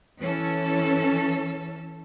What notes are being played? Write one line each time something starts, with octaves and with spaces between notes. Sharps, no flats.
E3 C#4 A4